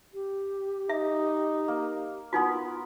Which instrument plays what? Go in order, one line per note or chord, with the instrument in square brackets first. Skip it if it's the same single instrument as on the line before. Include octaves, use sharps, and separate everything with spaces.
[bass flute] G4
[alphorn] D#4 [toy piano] E5
[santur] A#3
[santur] B3 A#4 [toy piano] D#4 F#4 [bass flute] F4